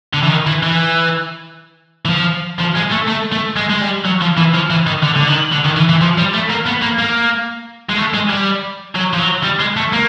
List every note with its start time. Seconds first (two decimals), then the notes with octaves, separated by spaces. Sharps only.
0.14 D3
0.23 E3
0.30 D#3
0.47 E3
0.63 E3
2.05 E3
2.09 F3
2.59 F3
2.75 G#3
2.91 A3
3.07 A3
3.32 A3
3.56 G#3
3.70 G#3
3.81 G3
4.05 F#3
4.22 F3
4.38 E3
4.54 F3
4.71 E3
4.87 D#3
5.03 D3
5.17 D3
5.28 D#3
5.53 D3
5.65 D#3
5.77 E3
5.89 E3
6.01 F3
6.18 G3
6.34 A3
6.50 A#3
6.67 B3
6.83 A#3
6.99 A#3
7.89 G#3
7.98 A3
8.14 G#3
8.30 G3
8.95 F#3
9.14 F3
9.20 F#3
9.44 G3
9.60 G#3
9.77 A3
9.93 A#3